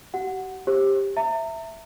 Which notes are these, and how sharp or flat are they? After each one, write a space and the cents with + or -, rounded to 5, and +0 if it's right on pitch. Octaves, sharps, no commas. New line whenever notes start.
G4 -40 F#5 +0
G4 +10 C5 +35
E5 +0 A#5 -35